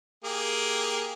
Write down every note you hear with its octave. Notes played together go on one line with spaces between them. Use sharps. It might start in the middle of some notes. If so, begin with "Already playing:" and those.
A#3 G4 G#4